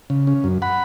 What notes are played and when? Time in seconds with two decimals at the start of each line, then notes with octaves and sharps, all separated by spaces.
0.10 C#3
0.27 C#4
0.44 F#2
0.62 F#5 B5